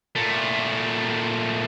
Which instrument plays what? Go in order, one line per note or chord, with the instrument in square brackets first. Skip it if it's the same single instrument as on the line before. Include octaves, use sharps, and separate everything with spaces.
[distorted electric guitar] A#2 A3